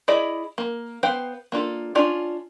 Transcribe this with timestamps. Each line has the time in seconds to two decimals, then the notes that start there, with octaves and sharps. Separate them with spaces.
0.08 E4 G#4 D5 D#5
0.58 A#3
1.03 B3 B4 C5 F5 G5
1.52 A#3 D4 F4 A4
1.95 C#4 D4 F4 D5